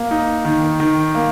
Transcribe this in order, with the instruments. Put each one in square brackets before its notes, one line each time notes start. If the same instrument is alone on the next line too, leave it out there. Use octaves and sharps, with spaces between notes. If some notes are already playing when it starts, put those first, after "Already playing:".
Already playing: [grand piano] A#3
D#4
D#3
D#3
A#3